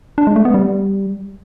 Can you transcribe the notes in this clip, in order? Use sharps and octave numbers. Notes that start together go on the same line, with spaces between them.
D4
G#3
A3
B3
G3